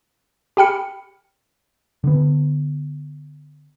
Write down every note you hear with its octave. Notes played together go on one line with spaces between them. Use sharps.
G4 G#4 G5 B5 F6 C#7
D3 B3